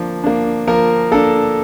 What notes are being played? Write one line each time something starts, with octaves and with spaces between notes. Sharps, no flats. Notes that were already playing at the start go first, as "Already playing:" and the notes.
Already playing: F3 A#3 D4
A#3 D4
F3 A#3 A#4
A#3 D4 A4